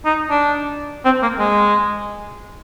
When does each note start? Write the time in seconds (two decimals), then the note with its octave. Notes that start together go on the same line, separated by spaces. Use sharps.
0.05 D#4
0.30 D4
1.05 C4
1.22 A#3
1.39 G#3